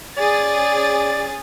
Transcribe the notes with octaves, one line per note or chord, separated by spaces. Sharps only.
C#4 G#4 D5 A6